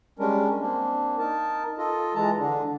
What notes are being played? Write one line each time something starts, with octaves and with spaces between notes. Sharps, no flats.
G3 G#3 C#4 D4 A#4
A#3 C4 D4
D#4 A#4 A5
F4 A4 D#5
E3 G#3 A5 A#5
D3 D4